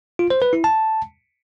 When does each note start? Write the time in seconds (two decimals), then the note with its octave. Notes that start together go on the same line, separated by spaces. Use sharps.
0.19 F4
0.30 C5
0.42 B4
0.53 E4
0.64 A5